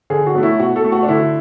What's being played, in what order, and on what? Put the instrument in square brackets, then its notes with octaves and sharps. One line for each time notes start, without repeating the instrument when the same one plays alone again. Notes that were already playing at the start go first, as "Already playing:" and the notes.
[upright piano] D3 G#4
F#4
F#3 A3
E4
B2 F#4
A4
A3
F#4
D4
D3 E4